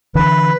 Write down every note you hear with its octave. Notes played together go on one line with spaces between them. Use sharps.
D3 E3 B4